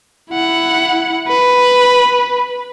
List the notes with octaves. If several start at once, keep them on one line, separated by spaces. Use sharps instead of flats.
E4 F#5
B4